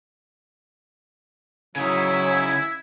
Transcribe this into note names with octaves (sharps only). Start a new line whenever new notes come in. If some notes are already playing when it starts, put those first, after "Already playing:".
C#3 F#3 D#4 E4 G#6